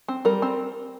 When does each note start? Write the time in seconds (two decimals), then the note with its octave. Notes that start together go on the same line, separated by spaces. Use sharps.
0.08 C4
0.25 G3 A#4
0.42 C4